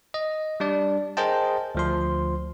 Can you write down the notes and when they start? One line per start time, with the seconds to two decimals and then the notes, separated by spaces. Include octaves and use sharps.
0.14 D#5
0.60 G3 D4 D5
1.17 G#4 A#4 C5 D#5 G5 A5
1.75 D2 F3 C6